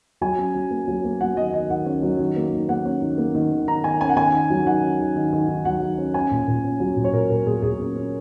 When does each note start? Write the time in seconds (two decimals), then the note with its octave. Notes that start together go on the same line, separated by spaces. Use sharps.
0.21 F#3 G#5
0.39 C#4
0.55 F#3
0.71 A#3
0.88 F#3
1.04 A#3
1.21 F#3 F#5
1.37 D#3 D#5
1.53 D#3 D#5
1.70 D#3 F#5
1.86 C#4
2.03 F#3
2.19 D#3
2.36 A#3
2.52 D#3
2.69 A#3 F#5
2.85 C#4
3.02 D#3
3.18 A#3
3.35 D#3
3.52 D#3
3.68 D#3 A#5
3.84 D#3 G#5
4.01 C#4 G#5
4.09 F#5
4.16 D#3 G#5
4.34 D#3
4.50 F#3
4.66 D#3 F#5
4.82 C#4
4.99 D#3
5.16 D#3
5.32 D#3
5.48 D#3
5.65 F#3 F#5
5.82 D#3
5.98 C#4
6.14 C#4 G#5
6.31 A#2
6.48 A#2
6.64 C#4
6.80 F#3
6.96 A#2
7.04 C#5
7.13 A#2 A#4
7.30 A#2 A#4
7.46 A#2 G#4
7.62 A#2 G#4
7.79 C#4
7.96 C#4